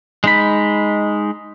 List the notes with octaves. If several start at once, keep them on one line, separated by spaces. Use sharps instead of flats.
G#3 D#4 B5